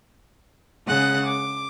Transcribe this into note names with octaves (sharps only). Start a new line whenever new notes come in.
C#3 G#3 F#5 F#6
D6